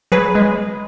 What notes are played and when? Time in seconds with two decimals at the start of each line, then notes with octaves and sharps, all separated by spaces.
0.12 F#3 G#4 B4
0.35 G#3